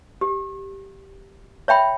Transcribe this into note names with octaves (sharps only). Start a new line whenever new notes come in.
G4
C#5 E5 G5 B5